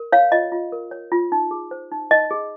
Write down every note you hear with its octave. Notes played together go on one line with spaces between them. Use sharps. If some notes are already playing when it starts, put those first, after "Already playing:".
Already playing: A#4
C#5 F5
F4 D#5
F4
A#4
C#5
F4
D#4
G#4
C5
D#4
D#4 D#5
G#4